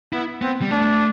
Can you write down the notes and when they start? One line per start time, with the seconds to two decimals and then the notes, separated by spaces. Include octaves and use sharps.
0.13 B3 E4
0.42 B3 C4
0.62 G3
0.71 A3 D4